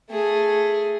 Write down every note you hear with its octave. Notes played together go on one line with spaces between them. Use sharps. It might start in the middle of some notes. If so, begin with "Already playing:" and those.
A3 G#4